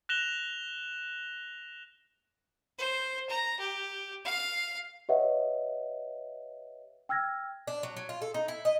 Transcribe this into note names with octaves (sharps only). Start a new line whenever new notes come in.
F#6 A#6 E7 F7 G7
C5
A#5
G4
F5
G4 B4 C#5 D#5 E5 F#5
G5 E6 F6 G#6 A#6
D4
F#3
F#3
F4
A4
D#4
E4
D#5